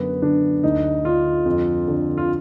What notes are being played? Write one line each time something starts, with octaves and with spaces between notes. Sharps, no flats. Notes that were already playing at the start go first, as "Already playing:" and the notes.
Already playing: F#2 D3 B3
D3 D4
D2 D#4
D3 F4
F2
D3
F4